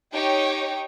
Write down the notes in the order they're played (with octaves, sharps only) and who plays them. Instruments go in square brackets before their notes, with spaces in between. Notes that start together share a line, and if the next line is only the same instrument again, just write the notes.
[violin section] D#4 G4 C#5 G5